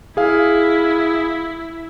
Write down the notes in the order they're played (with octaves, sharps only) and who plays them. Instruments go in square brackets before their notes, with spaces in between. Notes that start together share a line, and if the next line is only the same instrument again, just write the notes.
[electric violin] E4 [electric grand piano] G#4 F5